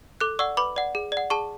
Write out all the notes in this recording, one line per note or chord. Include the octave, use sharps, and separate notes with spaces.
A4 D6 F#6
D5 F#5 C#6 E6
B4 B5 D6
D5 F#5
G#4
D5
F#5
G#4 A5 C#6